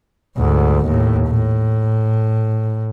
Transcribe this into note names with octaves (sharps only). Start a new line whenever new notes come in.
D2 G#2
D#2 A2
A2